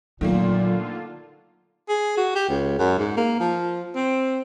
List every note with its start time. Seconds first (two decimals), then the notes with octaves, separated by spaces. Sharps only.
0.21 A#2 D3 D#3 F#3 A3 A#3 F4
1.89 G#4
2.17 F#4
2.35 G4
2.49 C#2
2.79 F#2
2.99 G#2
3.17 A#3
3.40 F3
3.96 C4